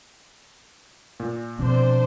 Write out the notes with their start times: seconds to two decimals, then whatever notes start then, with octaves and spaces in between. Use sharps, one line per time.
1.20 A#2
1.59 B2 F3 C4 D4 C5